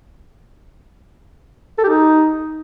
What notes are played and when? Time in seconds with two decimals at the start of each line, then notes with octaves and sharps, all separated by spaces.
1.78 A4
1.83 G4
1.89 D#4